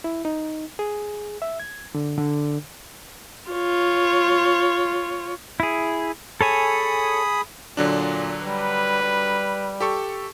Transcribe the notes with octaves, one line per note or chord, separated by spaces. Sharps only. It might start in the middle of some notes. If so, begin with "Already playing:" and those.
E4
D#4
G#4
E5
G#6
D3
D3
F4 C#5
E4 G#4
G#4 A4 C#5 G#5 B5 D#6
A#2 D3 F#3 D4
G3 B4
G3
G4 A4 C#6